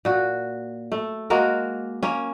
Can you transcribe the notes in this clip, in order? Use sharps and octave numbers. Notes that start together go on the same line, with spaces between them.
A#2 F#4
A3
G#3 A#3 F#4 A#4
A#3 C#4